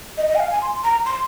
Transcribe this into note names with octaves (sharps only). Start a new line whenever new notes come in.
D#5
D#5
G#5
F5
G#5
C6
A#5
C6